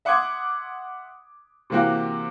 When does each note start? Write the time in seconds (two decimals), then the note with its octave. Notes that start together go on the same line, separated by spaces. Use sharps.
0.05 E5 F#5 C6 D6 D#6 G#6
1.70 C3 E3 A#3 F#4 G4